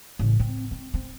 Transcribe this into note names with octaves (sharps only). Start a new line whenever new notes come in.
A1 C#3
C4
C4
C4